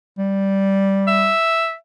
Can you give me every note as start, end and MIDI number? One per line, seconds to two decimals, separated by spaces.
0.18 1.32 55
1.07 1.74 76